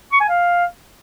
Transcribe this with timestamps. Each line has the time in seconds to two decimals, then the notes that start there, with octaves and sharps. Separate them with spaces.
0.12 C#6
0.20 G#5
0.29 F5